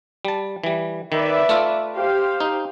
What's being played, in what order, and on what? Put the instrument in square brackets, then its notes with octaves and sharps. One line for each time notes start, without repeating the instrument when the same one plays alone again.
[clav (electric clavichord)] G3 A5
E3 G3
[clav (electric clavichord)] D#3 [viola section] B4 D5 E5
[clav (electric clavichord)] A3 F4
[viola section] G4 C5 F5
[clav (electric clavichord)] D#4